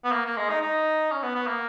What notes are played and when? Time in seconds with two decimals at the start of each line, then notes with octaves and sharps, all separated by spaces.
0.05 B3
0.12 A#3
0.25 A#3
0.37 G#3
0.50 D#4
0.62 D#4
1.11 C#4
1.23 B3
1.35 B3
1.47 A#3